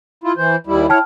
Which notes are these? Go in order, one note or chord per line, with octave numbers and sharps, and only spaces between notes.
E4 F4
E3 C5
D#2 G3 E4
E4 C#5 G5 A5 F6